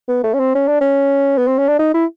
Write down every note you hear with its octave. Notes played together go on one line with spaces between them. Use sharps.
B3
A3
C#4
C4
C#4
D4
C#4
B3
C4
C#4
D4
D#4
E4